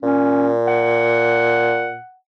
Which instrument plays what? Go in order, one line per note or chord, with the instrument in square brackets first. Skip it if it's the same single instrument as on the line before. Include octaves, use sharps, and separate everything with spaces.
[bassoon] A#2 [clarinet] C#4
[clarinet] F#5